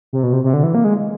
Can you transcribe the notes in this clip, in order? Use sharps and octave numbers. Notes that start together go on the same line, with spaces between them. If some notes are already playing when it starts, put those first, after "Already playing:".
C3
B2
C3
C3
D3
E3
A#3
G#3